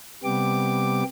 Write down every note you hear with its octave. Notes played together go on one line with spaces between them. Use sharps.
C3 G3 B3 G4 D6